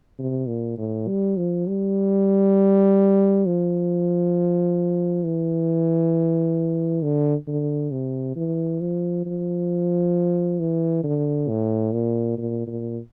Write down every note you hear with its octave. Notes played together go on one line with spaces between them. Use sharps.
C3
A#2
A2
G3
F3
G3
F3
E3
D3
D3
C3
E3
F3
F3
E3
D3
A2
A#2
A#2
A#2